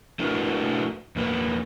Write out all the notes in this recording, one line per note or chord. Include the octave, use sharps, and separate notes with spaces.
A3 D4 E4 F#4 A#4 B4
E2 A#3 B4